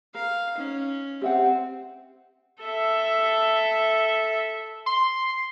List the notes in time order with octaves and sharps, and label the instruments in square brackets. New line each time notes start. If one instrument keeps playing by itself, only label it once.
[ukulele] A#4 [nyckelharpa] F5
[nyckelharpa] C#4 [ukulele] D#4
[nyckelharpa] C4 [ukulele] G4 E5 F#5
[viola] A4 E5
[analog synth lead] C6